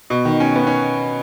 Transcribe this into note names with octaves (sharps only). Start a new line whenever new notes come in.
B2
D#3
C#4
B3
C#4